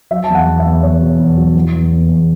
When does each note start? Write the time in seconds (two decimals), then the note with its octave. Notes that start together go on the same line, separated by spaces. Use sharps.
0.11 F#3 E5
0.24 A5
0.29 E2
0.35 F#5
0.47 E2
0.60 E5
0.65 E2
0.83 E2 C#5
1.02 B2
1.19 E2
1.37 F#3
1.55 E3
1.73 E2
1.92 E2
2.09 E2